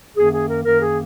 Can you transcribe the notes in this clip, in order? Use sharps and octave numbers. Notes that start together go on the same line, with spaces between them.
F#2 D#3 A#3 G#4
G#4
A#4
F#2 D#3 A#3 A#4
G#4